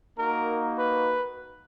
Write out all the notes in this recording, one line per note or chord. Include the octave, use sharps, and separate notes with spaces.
A#3 D#4 F#4 A#4
B4